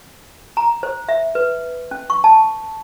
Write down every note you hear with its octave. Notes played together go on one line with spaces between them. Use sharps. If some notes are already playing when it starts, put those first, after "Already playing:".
A#5
C5
E5
B4
C#4
C#6
A5